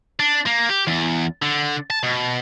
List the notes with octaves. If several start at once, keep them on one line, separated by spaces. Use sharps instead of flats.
D4
A#3
G4
E2
D3
A5
B2